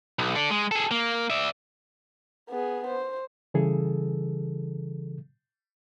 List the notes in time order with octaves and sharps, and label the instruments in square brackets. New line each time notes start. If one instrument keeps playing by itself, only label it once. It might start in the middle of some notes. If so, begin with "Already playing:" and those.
[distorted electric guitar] B1
A4 D5
G#3
G#4 A4
A#3
D5 E5
[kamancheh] B3 G#4
C5
[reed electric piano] C#3 E3 G3 G#4 A4